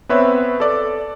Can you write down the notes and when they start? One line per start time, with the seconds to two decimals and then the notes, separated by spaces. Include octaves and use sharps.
0.09 B3 C4 B4 C#5 E5
0.60 A4 D5